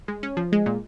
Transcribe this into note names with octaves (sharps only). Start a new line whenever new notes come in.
G#3
C#4
F3
G#3
A#2